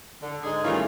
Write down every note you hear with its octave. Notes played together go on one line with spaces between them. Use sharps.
D3
G#2 D3 G#3 G#4
D#3 E3 G3 A3 C#4 F4